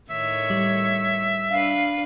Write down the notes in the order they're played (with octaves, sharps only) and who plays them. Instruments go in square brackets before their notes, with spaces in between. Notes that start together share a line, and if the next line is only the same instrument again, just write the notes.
[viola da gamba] A2 D#3 C#5 [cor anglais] E5
[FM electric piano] G3
[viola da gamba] D4 B4 [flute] F5